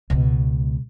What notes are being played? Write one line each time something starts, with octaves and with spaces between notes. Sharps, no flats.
C#2 B2